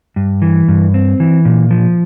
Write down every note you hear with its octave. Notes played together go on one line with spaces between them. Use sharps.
G2
E3
G2
C4
E3
A#2
F3